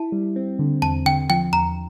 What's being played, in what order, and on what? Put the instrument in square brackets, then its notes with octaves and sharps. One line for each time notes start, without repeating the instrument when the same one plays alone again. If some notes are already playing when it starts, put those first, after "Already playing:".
Already playing: [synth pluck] E4 [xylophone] A5
[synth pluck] G3
C4
D3
[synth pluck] E2 [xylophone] A5
[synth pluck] D3 [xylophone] G5
[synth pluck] F3 [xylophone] G5
[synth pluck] E2 [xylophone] A#5